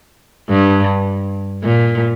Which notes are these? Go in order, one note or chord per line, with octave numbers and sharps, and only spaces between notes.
G2
A#2